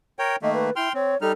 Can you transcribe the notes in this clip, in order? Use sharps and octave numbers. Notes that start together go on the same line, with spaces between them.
A#4 C#5 G5
D#3 A3 A#3 D#5
B4
E4 G5 C6 F6
C4 C#5
G3 D#4 A4 F6